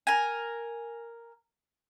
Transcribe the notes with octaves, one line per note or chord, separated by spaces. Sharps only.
A#4 G#5